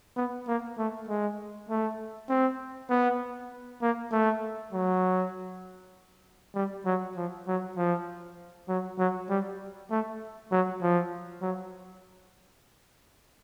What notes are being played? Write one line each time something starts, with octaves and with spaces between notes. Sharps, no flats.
B3
A#3
A3
G#3
A3
C4
B3
A#3
A3
F#3
G3
F#3
F3
F#3
F3
F#3
F#3
G3
A3
F#3
F3
F#3